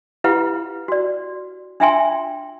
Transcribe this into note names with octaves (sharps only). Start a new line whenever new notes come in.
E4 F4 G4 B4 F5 F#5
F#4 D5
D4 F4 E5 G5 G#5 C6